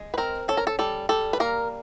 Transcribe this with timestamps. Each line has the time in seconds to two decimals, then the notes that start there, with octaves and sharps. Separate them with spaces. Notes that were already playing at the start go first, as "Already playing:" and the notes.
Already playing: G#3
0.14 B4
0.18 C4 A#4
0.48 C#4 A4
0.57 A#4
0.67 A4
0.79 G3 A4
1.09 G3 A4
1.33 B4
1.40 A#3 A#4